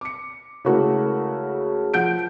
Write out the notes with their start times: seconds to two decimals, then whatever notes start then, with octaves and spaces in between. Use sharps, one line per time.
0.01 D6 C#7
0.65 C#3 G#3 A3 E4 F#4 A#4
1.94 F3 F#5 G6 D7